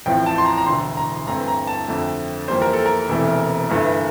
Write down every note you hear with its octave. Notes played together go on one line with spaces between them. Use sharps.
A1 A2 F3 C4 G5
A5
C6
A#5
A#5
E1 D2 D3 C6
A#5
G2 E3 A3 C4 A#5
A#5
A5
F2 D3 A3 C4
F2 E3 G3 A#3 C5
A#4
A4
A#4
E1 E2 C3 E3 A3
G1 G2 E3 A3